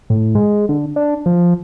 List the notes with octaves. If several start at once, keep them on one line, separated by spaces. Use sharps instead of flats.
A2
G#3
D3
D4
F3